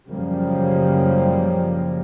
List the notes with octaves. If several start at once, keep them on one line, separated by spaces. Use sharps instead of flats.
F#2 C#3 F3 G3 A#3